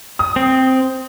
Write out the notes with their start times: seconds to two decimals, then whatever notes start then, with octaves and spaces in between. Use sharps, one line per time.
0.19 D#6
0.36 C4